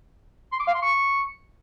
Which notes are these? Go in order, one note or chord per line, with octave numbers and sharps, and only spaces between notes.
C6
D6
F5
C6
C#6